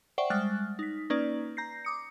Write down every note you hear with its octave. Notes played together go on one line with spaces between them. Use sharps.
C5 D5 E5 F#5 G5 C#6
G3 G#3 F6 F#6 A6
D#4 B6
A#3 C#4 D#4 B4 D5
A#5 G6 A#6 C7
D6 D#6 C#7